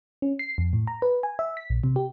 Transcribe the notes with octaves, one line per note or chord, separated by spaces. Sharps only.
C#4
C7
F2
A2
A#5
B4
G#5
E5
B6
A#1
C3
G4